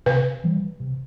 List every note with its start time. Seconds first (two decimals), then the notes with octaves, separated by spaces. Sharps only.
0.06 C3 B4
0.44 E3 G3
0.80 C3